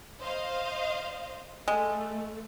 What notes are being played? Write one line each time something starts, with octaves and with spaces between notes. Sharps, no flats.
C5 D#5 F5
G#3 A3